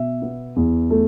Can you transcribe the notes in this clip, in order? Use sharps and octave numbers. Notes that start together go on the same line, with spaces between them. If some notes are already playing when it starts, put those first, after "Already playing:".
Already playing: B2 E5
B3
E2
A3